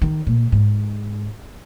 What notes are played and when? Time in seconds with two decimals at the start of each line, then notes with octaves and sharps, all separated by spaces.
0.02 D#3
0.27 A#2
0.52 G#2